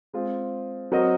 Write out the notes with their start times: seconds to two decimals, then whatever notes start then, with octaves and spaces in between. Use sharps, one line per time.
0.13 G#3 C4 F4 G#4
0.92 F#3 C4 F#4 A#4 D#5